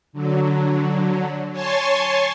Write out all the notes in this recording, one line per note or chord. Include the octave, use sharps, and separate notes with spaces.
D3 F#3
C#5 G#5 A5 C6 C#6